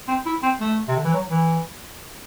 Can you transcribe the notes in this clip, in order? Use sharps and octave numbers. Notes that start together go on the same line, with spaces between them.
C4
E4
C4
A3
C3
D3
E3
F#3
E3